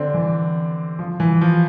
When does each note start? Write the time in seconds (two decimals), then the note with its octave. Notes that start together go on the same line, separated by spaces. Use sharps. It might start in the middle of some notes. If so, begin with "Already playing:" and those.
Already playing: D3 C4 D4
0.14 E3
0.99 F3
1.20 E3
1.41 F3